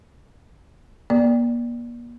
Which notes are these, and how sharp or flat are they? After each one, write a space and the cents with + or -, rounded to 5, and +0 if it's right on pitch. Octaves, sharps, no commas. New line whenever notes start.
A#3 +40 D5 +0